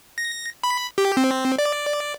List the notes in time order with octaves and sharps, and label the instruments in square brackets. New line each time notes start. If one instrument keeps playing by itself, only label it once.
[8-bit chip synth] A#6
B5
G4
C4
D5